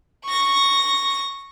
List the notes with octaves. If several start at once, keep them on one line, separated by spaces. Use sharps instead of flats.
C#6 A#6